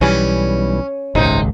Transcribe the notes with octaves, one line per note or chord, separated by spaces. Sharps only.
B1 E3 G3 C#4
D#1 G#1 C#2 C3 D#4